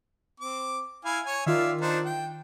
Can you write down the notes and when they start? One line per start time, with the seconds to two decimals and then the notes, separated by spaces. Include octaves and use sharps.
0.40 C4 D6
1.05 E4 F5 G#5
1.26 C#5 G#5
1.46 D#3 F4 D5 E5 F5
1.81 D4 D#4 C5
2.05 G5